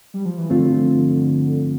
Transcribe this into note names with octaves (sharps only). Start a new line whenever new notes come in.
G3
F3
E3
G2 D3 F3 A3 C4 F4